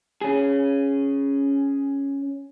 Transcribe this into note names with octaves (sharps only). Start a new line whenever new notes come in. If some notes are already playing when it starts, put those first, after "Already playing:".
C#4 G#4